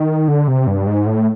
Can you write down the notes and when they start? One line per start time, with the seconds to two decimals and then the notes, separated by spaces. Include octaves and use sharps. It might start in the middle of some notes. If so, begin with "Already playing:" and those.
Already playing: D#3
0.28 D3
0.48 C3
0.67 G2
0.87 G#2
1.06 A2